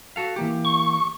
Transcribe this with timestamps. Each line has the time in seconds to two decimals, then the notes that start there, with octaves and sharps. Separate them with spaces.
0.16 F#4 A4 F5
0.36 E3 A#3 G4
0.65 C#6